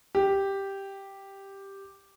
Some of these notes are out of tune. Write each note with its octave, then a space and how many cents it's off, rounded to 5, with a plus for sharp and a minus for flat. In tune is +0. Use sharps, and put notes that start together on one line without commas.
G4 +0